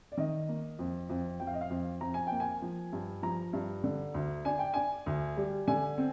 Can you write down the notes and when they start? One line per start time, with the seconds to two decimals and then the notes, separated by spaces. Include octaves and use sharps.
0.12 D5
0.17 D#3 D#5
0.49 A#3
0.79 F2
1.09 F2
1.40 F2 G5
1.47 F5
1.54 D#5
1.61 F5
1.70 F2
2.01 F2 A#5
2.14 G#5
2.27 A#3 G5
2.40 G#5
2.62 F3
2.93 G2
3.23 F3 A#5
3.53 G2
3.84 D3
4.14 D2
4.45 D4 G#5
4.59 G5
4.74 D4 G#5
5.06 D2
5.37 G3
5.68 D3 G#5
5.98 C4